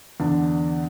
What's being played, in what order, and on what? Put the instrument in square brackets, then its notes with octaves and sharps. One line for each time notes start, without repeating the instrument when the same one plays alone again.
[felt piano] E2 D3 B3 D4